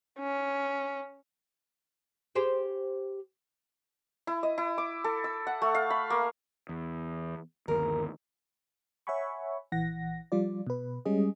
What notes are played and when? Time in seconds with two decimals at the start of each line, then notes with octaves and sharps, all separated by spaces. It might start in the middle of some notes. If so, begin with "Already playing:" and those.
0.19 C#4
2.35 G4 G#4 C5
4.27 E4
4.43 D#5
4.58 E4
4.78 D6
5.04 A4
5.24 E6
5.47 F#5
5.62 A3
5.75 F5
5.90 B5
6.10 A#3
6.69 E2
7.68 G1 D#2 A#4
9.07 C#5 E5 F#5 G#5 B5 C#6
9.72 A#1 E3 F#5 A#6
10.32 F3 G3 F4 D5
10.67 B2 B4
11.05 G3 G#3 C#4 G#4 D#5